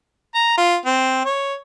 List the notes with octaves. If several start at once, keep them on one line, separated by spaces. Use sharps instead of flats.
A#5
F4
C4
C#5